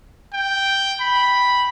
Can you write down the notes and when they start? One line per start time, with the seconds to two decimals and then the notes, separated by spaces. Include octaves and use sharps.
0.33 G5
1.01 B5